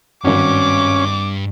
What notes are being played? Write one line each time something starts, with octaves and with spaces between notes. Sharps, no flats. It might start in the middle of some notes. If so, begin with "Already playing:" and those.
G#1 G2 C#4 F#4 D6